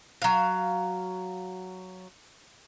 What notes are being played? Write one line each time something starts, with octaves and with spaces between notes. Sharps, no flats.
F#3 F5